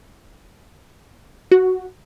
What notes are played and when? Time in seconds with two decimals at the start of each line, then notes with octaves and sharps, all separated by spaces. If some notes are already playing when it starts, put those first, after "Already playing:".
1.51 F#4